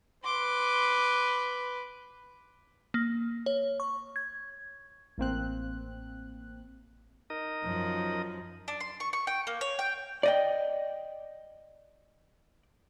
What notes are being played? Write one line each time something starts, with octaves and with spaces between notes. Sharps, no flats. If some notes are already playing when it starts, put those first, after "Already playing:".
B4 C6 D6
A#3
C#5
C#6
G#6
A1 A#3 C4 F#6
D#4 A#4 D#5
F#2 F3
D4
C6
C#6
C#6
G5
A#3
C#5
G5
D5 D#5 G5